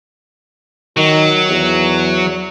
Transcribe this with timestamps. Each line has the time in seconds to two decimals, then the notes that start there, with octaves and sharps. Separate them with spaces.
0.97 D#3 F#3
1.49 E2